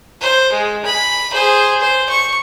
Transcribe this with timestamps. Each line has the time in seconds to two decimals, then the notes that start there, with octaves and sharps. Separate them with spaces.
0.21 C5
0.52 G#3
0.85 B5
1.33 G#4 C5
1.80 C5
2.09 C#6